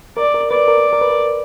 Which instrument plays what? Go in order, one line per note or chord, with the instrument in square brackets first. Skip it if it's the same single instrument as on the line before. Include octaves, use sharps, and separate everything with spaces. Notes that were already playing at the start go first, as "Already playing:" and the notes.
[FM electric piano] A#4 [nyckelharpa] D5
[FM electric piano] A#4
[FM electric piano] B4 [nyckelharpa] D5
[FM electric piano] A#4
A#4
B4
A#4